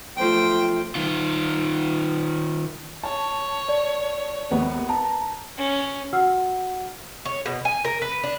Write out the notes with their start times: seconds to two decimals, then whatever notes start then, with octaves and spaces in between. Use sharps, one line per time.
0.17 B1 F3 A3 C5 G5
0.95 D#3 F4
3.03 C#5 A5
3.69 D5
4.51 G#1 D#2 B3
4.89 A5 A#5
5.58 C#4
6.13 F#4 F#5 E6 F6
7.25 C#5
7.46 B2
7.65 G#5
7.85 A#4
8.02 B4
8.23 D4